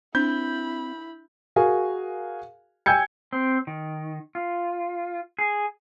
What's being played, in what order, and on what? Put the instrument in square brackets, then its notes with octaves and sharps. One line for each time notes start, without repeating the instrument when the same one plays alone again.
[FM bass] C4 [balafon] D4 [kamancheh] E4 B5 [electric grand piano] G6
[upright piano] F#4 G#4 A#4 F5 G#5
G5 G#5 E6 G6 G#6 C#7
[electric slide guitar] C4
D#3
F4
G#4